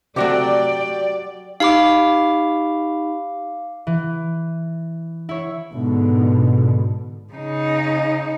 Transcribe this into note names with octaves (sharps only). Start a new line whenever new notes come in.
C3 F#3 A3 F#4 G4 D5 G5
D#4 G4 F5 B5 D6
E3
E4 C#5
G#2 B2 D3
C#3 D#4